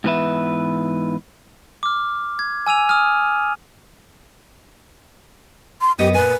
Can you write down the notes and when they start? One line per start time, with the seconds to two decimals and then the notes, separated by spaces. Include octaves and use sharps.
0.04 G#2 E3 B3 B4 E5
1.83 D6 F6
2.39 G#6
2.66 G#5 E6 D#7 F7
2.89 D#6 F6
5.81 C6
5.99 F#2 B3 G4 D#5
6.14 A#2 B4 G#5